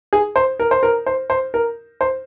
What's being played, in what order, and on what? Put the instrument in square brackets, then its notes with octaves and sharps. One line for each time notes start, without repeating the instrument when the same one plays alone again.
[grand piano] G#4
C5
A#4
C5
A#4
C5
C5
A#4
C5